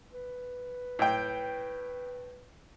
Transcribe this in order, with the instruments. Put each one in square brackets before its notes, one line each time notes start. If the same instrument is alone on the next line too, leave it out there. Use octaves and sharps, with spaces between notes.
[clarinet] B4
[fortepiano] A2 G5